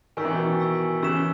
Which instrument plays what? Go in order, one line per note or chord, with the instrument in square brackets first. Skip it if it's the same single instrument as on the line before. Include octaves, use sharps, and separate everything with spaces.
[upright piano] D#3 [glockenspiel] G#5 C#6 E6 B6
[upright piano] E3
B2 D#3
[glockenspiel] G#5 C#6 E6 B6
[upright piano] C#3 E3 [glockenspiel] C#6 E6 B6 E7